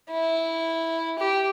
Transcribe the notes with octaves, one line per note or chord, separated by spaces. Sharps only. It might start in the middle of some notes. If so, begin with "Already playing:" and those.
E4
G4